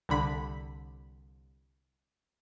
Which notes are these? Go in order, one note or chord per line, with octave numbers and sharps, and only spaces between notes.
C2 D3 B5 B6